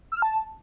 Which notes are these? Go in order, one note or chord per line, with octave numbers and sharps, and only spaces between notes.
E6
F6
A5